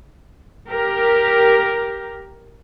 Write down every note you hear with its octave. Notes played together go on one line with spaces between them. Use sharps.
G4 A#4